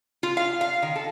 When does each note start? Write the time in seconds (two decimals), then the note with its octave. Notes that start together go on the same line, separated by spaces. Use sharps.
0.23 F4
0.37 F5
0.61 F5
0.82 D#3
0.96 A4